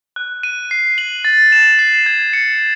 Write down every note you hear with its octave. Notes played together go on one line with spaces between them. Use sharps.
F#6
D#7
C7
F#7
A6
E7
C7
G#6
C#7